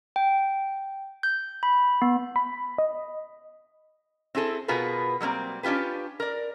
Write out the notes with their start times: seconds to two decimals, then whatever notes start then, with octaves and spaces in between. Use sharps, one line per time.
0.16 G5
1.23 G6
1.63 B5
2.02 B3
2.36 B5
2.78 D#5
4.35 C4 E4 G#4 A4
4.68 B2 B3 F4 G#4 A#4 B4
5.20 F#3 G3 A#3 C4
5.63 C#4 D4 F4 G4 B4
6.20 A#4 D5